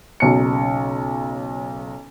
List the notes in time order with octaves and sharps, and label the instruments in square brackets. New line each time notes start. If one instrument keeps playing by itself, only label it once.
[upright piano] F#1 B1 C#7